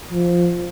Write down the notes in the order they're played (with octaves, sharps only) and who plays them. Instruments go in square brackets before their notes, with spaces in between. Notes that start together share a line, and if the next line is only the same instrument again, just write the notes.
[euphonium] F3